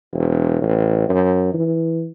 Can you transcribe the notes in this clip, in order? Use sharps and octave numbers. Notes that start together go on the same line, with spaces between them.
E1
A1
F#2
E3